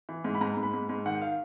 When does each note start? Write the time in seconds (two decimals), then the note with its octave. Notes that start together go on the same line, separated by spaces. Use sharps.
0.09 E3
0.24 G#2
0.35 B5
0.41 G#2 A#5
0.57 G#2
0.63 B5
0.74 G#2
0.89 G#2
1.06 D#3 F#5
1.22 F5